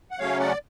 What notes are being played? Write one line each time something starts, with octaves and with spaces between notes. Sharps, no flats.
F#5
C#3 F#3 A3 C#4 C#5 F5
D5 F#5